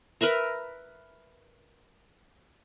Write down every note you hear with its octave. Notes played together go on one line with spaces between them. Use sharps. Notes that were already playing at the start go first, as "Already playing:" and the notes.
A#4 B4 E5 A#5